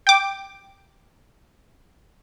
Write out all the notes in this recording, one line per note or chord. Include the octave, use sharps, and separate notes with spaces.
G5 D6